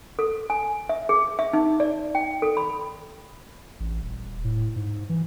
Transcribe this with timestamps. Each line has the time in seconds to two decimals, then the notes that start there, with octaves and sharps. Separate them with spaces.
0.19 A4
0.50 G#5
0.89 E5
1.09 G#4
1.39 E5
1.53 D#4
1.80 D5
2.15 G5
2.42 A4
2.57 B5
3.80 A1
4.02 D#1
4.44 A2
4.76 G#2
5.09 E3